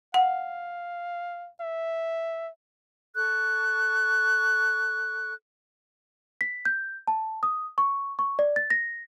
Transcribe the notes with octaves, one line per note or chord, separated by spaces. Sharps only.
F5 F#5
E5
A4 C#6 F#6
B6
G6
A5
D#6
C#6
C#6
D5
A6
A#6